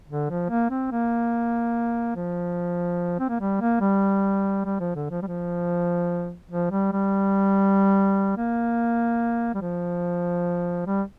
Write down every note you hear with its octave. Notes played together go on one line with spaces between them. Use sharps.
D3
F3
A#3
C4
A#3
F3
C4
A#3
G3
A#3
G3
G3
F3
D3
F3
G3
F3
F3
G3
G3
A#3
G3
F3
G3